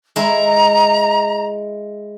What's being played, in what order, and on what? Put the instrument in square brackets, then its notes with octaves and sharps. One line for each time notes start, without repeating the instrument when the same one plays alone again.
[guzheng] G#3 E4 [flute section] A#5